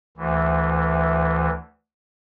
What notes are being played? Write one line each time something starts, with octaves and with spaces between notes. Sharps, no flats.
D2 E3